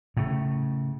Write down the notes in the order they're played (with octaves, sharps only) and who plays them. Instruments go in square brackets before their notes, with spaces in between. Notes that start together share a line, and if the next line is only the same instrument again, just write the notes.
[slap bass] A2 C#3